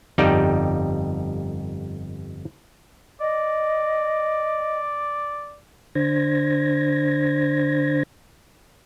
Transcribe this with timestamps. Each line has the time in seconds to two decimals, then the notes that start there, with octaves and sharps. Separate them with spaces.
0.18 G1 F2 G3 D#4 D5
3.20 D5 D#5
5.95 D3 D4 C5 G#6 A#6